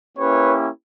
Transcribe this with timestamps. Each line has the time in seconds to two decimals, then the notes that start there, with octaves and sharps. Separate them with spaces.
0.18 A#3 C#4 E4 G4 B4 C#5